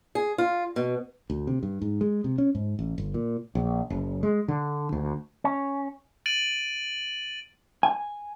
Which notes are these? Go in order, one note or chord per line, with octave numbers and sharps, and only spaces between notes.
G#4
F4
B2
D2
C3
G2
G#2
G#3
C3
C#4
G#2
A1
G1
A#2
A#1
F#1
G#3
D3
D2
C#4
A6 D7 D#7 F#7
G#5